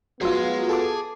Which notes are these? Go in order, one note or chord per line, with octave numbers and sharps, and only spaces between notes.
F#3 B3 F4 G#4 C6
A4 A5 D6